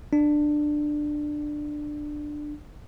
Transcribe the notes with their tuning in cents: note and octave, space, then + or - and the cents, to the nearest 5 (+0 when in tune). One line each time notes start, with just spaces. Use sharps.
D4 +15